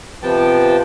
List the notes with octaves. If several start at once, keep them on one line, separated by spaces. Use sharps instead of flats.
C3 F3 B3 G5 A5